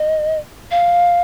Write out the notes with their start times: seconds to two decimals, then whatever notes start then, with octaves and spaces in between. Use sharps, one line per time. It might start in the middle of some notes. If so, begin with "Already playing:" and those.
Already playing: D#5
0.71 F5